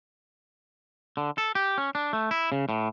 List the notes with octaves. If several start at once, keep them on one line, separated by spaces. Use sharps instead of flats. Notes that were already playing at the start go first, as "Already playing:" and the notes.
D3
A4
G4
C#4
D4
A3
E4
C#3
A2